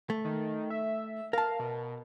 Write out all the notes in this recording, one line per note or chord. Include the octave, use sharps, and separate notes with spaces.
A3
D#3
E5
A#4 F5 A5
B2